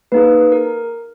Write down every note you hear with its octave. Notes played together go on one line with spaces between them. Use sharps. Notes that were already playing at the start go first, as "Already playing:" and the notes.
A#3 D#4 G#4 B4
A#4